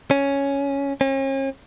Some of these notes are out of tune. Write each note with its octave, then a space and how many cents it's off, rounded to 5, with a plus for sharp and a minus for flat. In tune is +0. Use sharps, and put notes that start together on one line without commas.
C#4 +5
C#4 -40